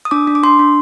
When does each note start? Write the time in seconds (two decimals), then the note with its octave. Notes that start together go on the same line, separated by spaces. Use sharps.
0.05 D#6
0.11 D4 D6
0.27 D4
0.35 D6
0.43 D4 C6
0.59 D4